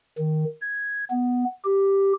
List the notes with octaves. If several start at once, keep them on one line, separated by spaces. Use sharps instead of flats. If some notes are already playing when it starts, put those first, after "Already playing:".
D#3
G#6
B3
G4